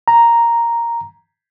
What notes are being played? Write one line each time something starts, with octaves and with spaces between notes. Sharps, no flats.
A#5